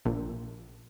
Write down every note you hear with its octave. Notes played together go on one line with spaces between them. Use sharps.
A#1